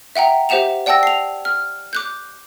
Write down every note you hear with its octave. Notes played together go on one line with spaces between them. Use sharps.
E5 F#5 G5 A#5
G4 C5 E5 F#5 E7 F7
D5 F#5 G5 A5 E6 A#6
C7 F7
F6
D6 F#6 G6